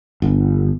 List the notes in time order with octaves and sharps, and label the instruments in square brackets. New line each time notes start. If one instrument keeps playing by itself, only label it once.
[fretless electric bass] G1